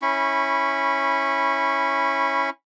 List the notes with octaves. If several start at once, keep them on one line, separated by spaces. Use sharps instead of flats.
C#4 E4 B5 C#6